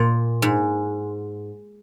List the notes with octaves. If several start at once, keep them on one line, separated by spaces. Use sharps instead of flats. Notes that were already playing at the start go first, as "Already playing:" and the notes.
Already playing: A#2
G#2